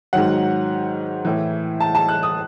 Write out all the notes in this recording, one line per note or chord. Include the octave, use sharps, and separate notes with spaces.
G#2 D#3 F#3 F#5
A2 E3
A5
A5
F#6
D#6